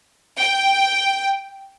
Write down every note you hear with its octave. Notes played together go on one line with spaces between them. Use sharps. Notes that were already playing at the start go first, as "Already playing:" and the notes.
G5